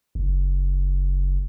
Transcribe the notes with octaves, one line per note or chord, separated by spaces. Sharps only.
F#1